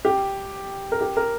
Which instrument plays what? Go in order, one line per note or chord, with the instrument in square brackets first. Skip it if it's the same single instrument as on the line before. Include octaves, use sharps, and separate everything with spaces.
[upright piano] G4
A#4
G4
A#4